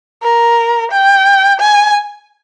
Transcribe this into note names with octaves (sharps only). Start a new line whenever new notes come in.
A#4
G5
G#5